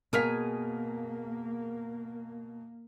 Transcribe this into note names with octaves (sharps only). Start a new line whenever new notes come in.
B2 A#3 G#4 A#4 F5 F6 B6